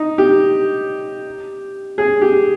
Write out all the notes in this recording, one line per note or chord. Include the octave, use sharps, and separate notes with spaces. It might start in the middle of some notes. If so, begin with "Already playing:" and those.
Already playing: D#4
G4
G#4
G4